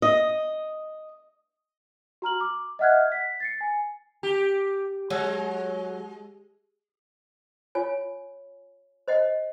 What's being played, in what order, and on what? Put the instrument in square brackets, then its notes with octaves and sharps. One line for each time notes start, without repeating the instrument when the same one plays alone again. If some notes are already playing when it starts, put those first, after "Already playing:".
[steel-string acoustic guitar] D#5
[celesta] F#4 A#5 F6 F#7
D6
D#5 E5 F#5 F6 F#6 G#6
B6
A6 C7 C#7
G#5
[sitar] G4
[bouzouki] F#3 [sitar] G#3
[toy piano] F4 C#5 G#5
C5 D#5 F#5